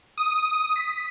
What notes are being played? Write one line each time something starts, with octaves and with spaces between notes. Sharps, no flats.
D#6
B6